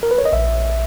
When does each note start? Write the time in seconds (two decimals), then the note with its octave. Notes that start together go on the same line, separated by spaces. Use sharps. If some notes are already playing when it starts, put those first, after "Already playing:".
0.03 A#4
0.11 B4
0.18 C#5
0.25 D#5
0.33 A#1 E5